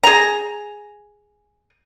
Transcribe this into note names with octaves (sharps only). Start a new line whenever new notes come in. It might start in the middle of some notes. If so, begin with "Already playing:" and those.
G#4 A#5